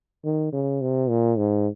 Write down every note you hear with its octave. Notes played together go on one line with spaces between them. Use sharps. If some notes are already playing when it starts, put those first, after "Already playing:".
D#3
C#3
C3
A#2
G#2